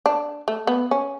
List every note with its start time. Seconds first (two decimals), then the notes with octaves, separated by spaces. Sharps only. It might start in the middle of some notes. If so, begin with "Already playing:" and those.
0.06 D4
0.48 A3
0.67 B3
0.91 C#4